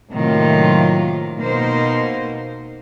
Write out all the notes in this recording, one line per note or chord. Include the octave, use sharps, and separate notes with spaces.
A2 C3 D#3 F#3 A#3 F4
B2 A#3 D#4 C5